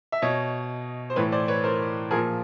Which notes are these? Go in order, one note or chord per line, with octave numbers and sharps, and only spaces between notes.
E5
B2 C#5 D#5
C5
A2 E3 B4 C#5
C5 D5
B4 C#5
A#4 C5
A#2 F3 G#4 A#4